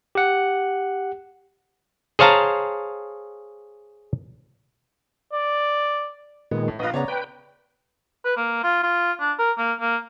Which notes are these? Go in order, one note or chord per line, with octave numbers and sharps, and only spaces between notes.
G4 F#5
G#4 C5 C#5 F5 A5 A#5
D5
A#2 D#3 G#3 B3
A2
A#1 F4 B4 D#5
C#3 B3 C#5 D5 A#5
B4 G5
B4
A#3
F4
F4
D4
A#4
A#3
A#3